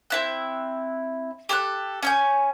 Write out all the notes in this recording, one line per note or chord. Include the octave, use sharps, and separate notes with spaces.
C4 E4 F#6
G4 A4 C#6 F#6
C#4 G#5 G6